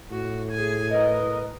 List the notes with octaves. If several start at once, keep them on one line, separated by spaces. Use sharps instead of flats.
A2 F#4
G#4 G#5
A#4 B4 D#5